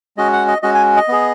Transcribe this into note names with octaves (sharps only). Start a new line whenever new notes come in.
G#3 C#4 F#4 D#5
F#5
D#5
G#3 C#4 F#4 D#5
G#5
D#5
B3 G#4